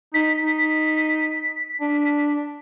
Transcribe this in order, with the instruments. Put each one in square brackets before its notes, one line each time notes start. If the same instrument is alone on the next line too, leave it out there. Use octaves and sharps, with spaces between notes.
[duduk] D#4 [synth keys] B6
[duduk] D#4
D4